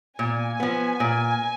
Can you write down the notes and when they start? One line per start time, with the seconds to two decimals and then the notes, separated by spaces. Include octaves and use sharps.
0.19 A#2 G#5
0.60 F3 B3
1.00 A#2